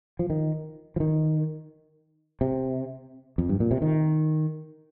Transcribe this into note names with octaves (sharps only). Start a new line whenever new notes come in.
F3
D#3
F3
D#3
C3
F2
G2
A#2
C3
D#3